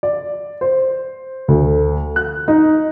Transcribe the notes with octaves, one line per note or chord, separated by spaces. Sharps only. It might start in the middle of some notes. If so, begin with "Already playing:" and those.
D5
C5
D2
F#6
D#4